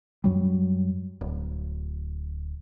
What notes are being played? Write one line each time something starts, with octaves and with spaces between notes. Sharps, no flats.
F#2 F#3 G3
D1